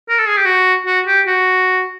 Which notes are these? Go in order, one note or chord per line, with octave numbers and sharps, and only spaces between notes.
A#4
A4
G#4
G4
F#4
F#4
G4
F#4